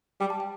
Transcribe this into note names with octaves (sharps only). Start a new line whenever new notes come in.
G3 G5
A5
G5